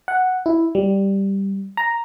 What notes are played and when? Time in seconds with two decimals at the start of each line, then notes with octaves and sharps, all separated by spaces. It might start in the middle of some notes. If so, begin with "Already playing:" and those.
0.08 F#5
0.46 E4
0.75 G3
1.77 A#5